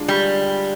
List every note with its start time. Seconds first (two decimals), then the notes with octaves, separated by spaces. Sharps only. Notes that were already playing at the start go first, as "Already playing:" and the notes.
Already playing: D3 G#3 D4 F4 G#4
0.08 G3